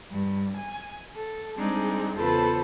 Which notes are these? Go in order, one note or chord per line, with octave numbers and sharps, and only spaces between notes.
G2
G#5
A4
G3 G#3 C4 D4 D#4 G#4
E2 C#3 F4 A4 B4 C5